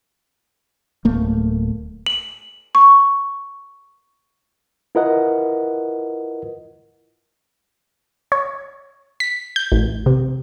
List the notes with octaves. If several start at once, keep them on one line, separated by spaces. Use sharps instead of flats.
D1 A3 A#3
F#7
C#6
E4 F4 A#4 B4 D#5 F#5
C#5
B6
G6
A1
C3